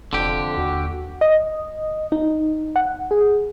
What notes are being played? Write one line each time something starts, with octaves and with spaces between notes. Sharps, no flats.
F1 F2 D3 G4
D#2 F#4
D#5
D#4
F#5
G#4